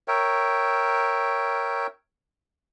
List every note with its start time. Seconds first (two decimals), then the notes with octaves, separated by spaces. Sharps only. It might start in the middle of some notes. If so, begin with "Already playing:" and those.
0.08 A#4 C#5 E5 G5